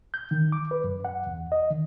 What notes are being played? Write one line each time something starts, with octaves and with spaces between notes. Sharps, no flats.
G6
D#3
D6
B4
F#2
F#5
E2
D#5
D#3